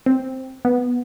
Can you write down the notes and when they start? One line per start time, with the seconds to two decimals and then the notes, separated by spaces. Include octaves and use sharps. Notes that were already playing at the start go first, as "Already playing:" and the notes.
0.06 C4
0.65 B3